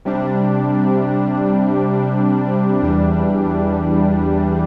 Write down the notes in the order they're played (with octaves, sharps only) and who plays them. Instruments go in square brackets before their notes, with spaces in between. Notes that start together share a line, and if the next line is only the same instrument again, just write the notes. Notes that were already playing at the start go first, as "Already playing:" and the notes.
[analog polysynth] C3 G3 D4
E2 E3 G3 D4